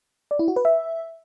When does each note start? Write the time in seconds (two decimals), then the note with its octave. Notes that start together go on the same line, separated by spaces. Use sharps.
0.31 D5
0.39 E4
0.48 F#4
0.56 B4
0.65 E5